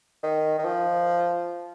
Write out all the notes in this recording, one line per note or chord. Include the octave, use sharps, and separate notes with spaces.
D#3
D#3
F3